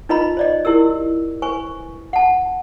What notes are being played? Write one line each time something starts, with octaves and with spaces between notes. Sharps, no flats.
D#4 F4 B4 D#5 A#5 B5
C5 D5 D#5
E4 G4 A#4 E6
B4 C5 G#5 C#6
F#5 A5